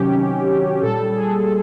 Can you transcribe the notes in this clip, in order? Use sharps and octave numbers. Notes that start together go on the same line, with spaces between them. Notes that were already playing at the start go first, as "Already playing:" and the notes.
Already playing: C3 D#3 F#3 C#4 G4
A#2 G3 A4
G#4